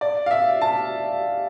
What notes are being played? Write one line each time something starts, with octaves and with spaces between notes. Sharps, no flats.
D5
F5
E5
A5